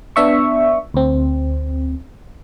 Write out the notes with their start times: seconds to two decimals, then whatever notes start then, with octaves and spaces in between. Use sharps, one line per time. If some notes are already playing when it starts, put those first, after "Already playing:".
0.16 B3 D4 E5 C#6
0.94 D2 C4